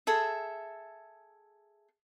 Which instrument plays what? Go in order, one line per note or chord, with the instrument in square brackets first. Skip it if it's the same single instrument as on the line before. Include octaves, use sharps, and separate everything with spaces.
[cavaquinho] G#4 A4 E5